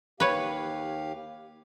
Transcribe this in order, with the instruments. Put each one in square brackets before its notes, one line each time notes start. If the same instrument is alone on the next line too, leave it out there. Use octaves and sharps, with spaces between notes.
[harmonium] D#2 G4 F5 [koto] B4 C#5